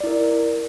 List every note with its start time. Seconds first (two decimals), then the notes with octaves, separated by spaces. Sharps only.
0.01 D5
0.04 E4
0.07 A#4